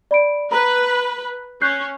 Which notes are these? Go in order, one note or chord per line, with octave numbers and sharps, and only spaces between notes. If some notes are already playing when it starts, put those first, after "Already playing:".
D5 B5 D7
B4 A#5 B5
C#4 F#6 G6 C7